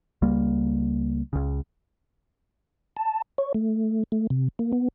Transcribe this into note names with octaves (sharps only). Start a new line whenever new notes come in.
C#2 G3 A#3
C#2 C#3
A5
C#5
A3
A3
C3
A#3
B3